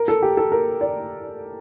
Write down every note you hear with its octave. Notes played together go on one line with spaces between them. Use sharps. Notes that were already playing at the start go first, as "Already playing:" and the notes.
Already playing: A#4
A4
G4
A4
A#4
D5